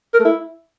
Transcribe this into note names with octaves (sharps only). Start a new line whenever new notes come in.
A#4
A3
E4